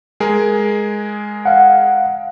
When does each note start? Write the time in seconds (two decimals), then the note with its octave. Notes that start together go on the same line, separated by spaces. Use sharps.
0.20 G#3 G#4 A#4
1.45 F5 F#5